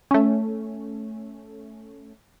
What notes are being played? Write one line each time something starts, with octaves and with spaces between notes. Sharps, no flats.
A3 C#4